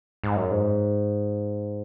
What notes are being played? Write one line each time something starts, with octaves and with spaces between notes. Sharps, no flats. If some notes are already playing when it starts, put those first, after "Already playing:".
G#2
F#2
G#2